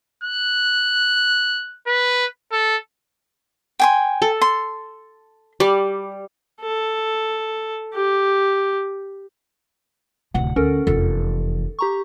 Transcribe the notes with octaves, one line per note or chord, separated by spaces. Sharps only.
F#6
B4
A4
G5 G#5 C6
A4
C6
G3 D6
A4
G4
D1 C3 F#5
D2 C#4 A4 A#4
F1 E2 A4
G4 A#5 C#6